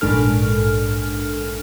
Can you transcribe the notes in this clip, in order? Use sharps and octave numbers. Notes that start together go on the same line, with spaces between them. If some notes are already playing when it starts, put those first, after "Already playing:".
A#1 G#2 D4 A4 F6